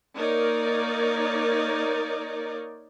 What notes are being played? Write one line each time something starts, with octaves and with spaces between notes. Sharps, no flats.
A#3 D#4 A#4 C#5 D5